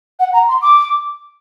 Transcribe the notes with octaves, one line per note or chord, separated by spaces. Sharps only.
F#5
A#5
C6
D6